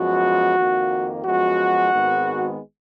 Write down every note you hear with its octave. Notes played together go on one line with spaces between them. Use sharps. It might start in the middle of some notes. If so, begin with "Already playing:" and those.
Already playing: F#2 F3 G#3 B3 F#4
F2 D#3 A#3
F#2 F3 G#3 B3 F#4
G#1 G#2 D#3 G#3 B3